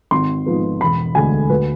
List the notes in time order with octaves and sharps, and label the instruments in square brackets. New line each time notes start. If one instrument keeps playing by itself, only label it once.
[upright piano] G#1 C6
G#2 F3 B3
E1 B5
D2 D3 G#3 G#5
D2 B4